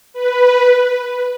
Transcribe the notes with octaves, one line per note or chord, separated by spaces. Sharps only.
B4